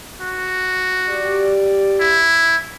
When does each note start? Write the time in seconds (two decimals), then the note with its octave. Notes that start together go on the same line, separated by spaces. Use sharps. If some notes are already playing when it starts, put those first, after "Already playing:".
0.20 F#4
1.09 G4 D5
2.00 E4